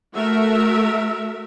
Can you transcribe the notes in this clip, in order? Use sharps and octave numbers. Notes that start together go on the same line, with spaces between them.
A3 F#4 A#4 E5